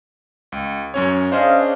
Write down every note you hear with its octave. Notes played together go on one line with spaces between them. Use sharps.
C#2
F#2 C#4 C#5
C#4 D4 G#4 C5 D#5 F5